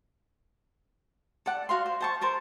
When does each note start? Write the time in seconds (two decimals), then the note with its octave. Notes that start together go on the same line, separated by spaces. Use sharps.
1.46 A4 D5 F#5
1.69 F#4 F5 C6
1.86 C5
2.01 C5 A5 C#6
2.21 A4 A#4 C5